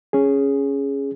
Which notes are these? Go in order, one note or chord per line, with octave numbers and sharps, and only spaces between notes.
C#4 G#4